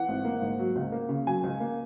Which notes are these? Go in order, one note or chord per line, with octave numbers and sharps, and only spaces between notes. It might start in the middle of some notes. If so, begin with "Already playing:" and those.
Already playing: E3 F#5
G#1
A#3
G#2
F#3
C#2
A#3
C#3
F#3 G#5
C#2
A#3